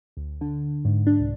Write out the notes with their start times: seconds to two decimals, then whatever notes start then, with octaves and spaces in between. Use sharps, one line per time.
0.17 D2
0.41 D3
0.85 G#2
1.07 D4
1.19 C2